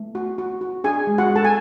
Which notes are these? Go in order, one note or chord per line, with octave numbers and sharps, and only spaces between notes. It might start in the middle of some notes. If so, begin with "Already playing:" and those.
Already playing: A3
F#4
F#4
F#4
D4 G#4 G#5
G#3
F#4 F#5
G#3
A4 A5
G#5